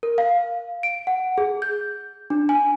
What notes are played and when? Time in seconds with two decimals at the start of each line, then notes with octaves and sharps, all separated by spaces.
0.03 A#4
0.18 F5
0.83 D7
1.07 F#5
1.38 G#4
1.62 G6
2.30 D4
2.49 G#5